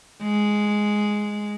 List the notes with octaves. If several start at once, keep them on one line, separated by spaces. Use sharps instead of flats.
G#3